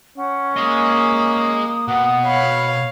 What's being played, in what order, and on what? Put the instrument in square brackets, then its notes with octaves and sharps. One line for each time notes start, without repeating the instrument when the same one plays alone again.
[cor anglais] C#4 [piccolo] F#5
[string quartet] A#3 [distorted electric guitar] G#4 D#5 [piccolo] D#6
[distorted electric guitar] B2 [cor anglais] F#5
[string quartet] C#5 F5 [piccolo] B5